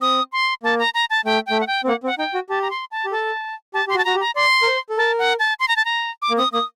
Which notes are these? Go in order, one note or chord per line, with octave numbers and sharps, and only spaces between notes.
C4 D#6
C6
A#3 A5
A#5
A#5
A5
A3 G5
A3 G5
F#5
G5
C4
A#3 F#5
C4 F#5
D#4 G5
F#4
G4 A5
A#5
C6
A5
G4
A4 A5
G4 A5
G4 C6
F#4
A5
F#4 A#5
G4
A#5
D5 C6
A#4
C5
A4
A#4 A5
F#5
A5
C6
A#5
A5
A#5
D6
A#3
C4 D#6
A#3 D#6